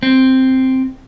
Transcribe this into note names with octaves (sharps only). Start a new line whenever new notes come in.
C4